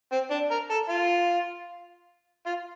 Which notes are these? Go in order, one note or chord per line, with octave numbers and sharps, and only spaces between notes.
C4
D4
A#4
A4
F4
F4